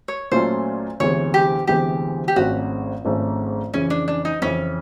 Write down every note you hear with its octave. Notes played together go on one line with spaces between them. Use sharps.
C#5
A#2 F#3 A3 C#4 F4 C5
D2 C3 E3 G#3 B3 C#5
G4
D2 C3 E3 G#3 B3 G4
G4
G#1 G#2 F3 A3 C#4 F#4
G#1 G#2 F3 A3 C#4
F2 C#3 E3 C#4
D4
D4
D#4
F2 C#3 E3 C#4